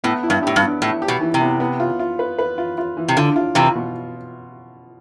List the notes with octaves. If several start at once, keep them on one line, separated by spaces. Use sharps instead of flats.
A2 B3
E4
G2
A2 G4
G2
B3
A2 E4
G4
B2
E3
C3
B3
B3
F4
F4
B4
B4
F4
F4
E3
C3
D3 F4
F4
C3 E3 F4
B2